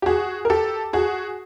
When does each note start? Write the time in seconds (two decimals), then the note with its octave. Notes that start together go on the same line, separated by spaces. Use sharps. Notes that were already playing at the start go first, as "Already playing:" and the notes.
0.02 G4
0.06 F#4 G#4
0.45 A#4
0.50 G4 A4
0.93 F#4 G#4